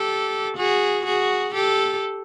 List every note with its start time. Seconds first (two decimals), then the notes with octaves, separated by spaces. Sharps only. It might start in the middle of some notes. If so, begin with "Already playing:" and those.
Already playing: G4 A4
0.57 F#4 G#4
1.05 F#4 G#4
1.54 G4 A4